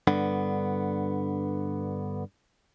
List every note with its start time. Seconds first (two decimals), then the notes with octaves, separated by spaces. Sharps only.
0.07 G2 D3 B3